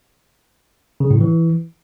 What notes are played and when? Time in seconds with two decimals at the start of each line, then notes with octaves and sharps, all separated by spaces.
1.00 C#3
1.11 A2
1.21 E3